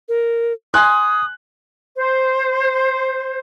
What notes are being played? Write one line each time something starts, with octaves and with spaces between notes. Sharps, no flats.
A#4
G#5 C6 D#6 F#6
C5